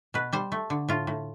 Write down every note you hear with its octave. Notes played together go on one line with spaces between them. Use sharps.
B2 B4
G3 C5
A3
D3
A2 F4
A2